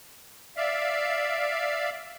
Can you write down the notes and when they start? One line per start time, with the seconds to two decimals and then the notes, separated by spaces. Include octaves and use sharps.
0.57 D5 E5 F5